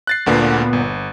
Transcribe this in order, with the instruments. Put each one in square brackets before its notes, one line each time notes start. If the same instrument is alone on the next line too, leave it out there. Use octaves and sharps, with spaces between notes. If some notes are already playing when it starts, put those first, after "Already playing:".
[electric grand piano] F#6 A6 C7
[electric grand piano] D2 D3 A#3 [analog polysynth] A#2 B3
[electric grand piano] G1